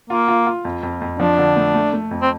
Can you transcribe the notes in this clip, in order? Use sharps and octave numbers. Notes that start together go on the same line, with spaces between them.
A#3 F4
F4
F4
F2
F2
F2
F3 D4
D3
A3
A3
A3
F2
C4